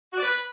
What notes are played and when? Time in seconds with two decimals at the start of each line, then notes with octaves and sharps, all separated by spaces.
0.12 F#4
0.17 D5
0.23 B4